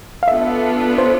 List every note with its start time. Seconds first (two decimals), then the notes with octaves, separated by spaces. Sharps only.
0.23 F5
0.28 B3 D4 F4 A4 E5
0.98 C5